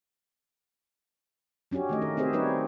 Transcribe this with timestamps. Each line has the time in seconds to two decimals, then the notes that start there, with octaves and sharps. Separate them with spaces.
1.71 F#3 C#4 D4 F#4 G4
1.89 D#3 A3 D#5
2.02 A#4
2.17 C4 G4 G#4 C5 E5
2.33 G3 D#4 B4 C#5